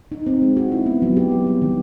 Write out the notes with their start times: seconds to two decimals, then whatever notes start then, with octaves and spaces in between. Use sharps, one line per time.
0.12 D#4
0.27 C4
0.42 G#3
0.57 F#4
0.72 E4
0.86 B3
1.02 F#3
1.17 G4
1.31 B3
1.47 G3
1.62 D#3